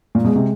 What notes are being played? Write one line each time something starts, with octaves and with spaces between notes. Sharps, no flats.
A#2
G3
B2 G#3
C3